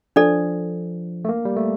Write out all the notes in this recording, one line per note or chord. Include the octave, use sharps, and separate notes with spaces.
F3 D4 A4 D5
A3
A#3
G3
A3